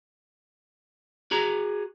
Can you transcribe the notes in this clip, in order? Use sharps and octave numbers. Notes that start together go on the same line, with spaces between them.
F#4 G#4 A#5